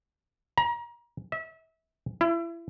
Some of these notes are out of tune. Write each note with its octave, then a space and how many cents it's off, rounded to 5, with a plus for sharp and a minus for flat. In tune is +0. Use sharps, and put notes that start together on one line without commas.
A#5 +30
E5 -30
E4 +30